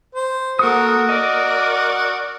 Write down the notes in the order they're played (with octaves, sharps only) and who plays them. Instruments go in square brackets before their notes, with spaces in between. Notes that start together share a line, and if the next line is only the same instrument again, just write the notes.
[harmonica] C5
[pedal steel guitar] A#3 F#5 D#6 [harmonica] F#4 [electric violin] A4 A#4
[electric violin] A#4 D5 [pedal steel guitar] D#5